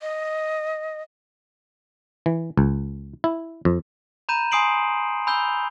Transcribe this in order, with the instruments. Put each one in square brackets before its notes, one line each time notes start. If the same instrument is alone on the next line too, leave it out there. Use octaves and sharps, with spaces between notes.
[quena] D#5
[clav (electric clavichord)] E3
C#2
E4
F2
[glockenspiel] A#5 B5 G6 D#7 E7
G#5 C6 D#6 C7 D7 F#7
G#5 B5 E6 G6 F7 G7